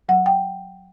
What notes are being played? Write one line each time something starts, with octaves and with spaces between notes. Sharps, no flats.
F#3 F#5
G5